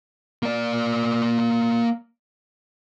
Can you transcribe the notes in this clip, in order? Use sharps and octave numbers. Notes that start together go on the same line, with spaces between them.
A#3 D5